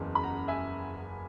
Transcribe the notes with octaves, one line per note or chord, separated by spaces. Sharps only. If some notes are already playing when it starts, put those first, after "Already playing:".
Already playing: F#1 E2 C#3
B5
F#5 A#5
E5 G#5